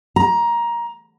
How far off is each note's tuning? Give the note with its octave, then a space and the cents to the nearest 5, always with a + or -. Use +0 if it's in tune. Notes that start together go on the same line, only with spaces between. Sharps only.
A#5 +15